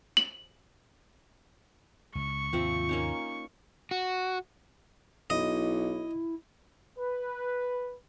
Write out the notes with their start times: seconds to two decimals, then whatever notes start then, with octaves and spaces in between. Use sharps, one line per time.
0.17 F#7
2.15 C#2 C#6
2.53 D#2 G#2 C3 F3 C4 E5
2.89 A#3 C#4 D#4
3.91 F#4
5.30 B1 E4 D#5
6.97 B4